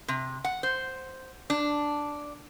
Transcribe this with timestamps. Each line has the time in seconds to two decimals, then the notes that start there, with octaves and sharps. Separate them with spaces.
0.08 C3
0.44 F#5
0.63 C5
1.50 D4